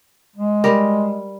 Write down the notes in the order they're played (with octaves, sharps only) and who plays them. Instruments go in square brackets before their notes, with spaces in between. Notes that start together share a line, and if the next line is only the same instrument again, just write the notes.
[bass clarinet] G#3
[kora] G3 A#4